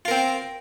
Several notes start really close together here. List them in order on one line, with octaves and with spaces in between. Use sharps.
F4 A#4 C4